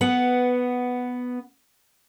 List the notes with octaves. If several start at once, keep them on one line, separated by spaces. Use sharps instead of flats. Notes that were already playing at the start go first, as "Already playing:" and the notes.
B3 F#5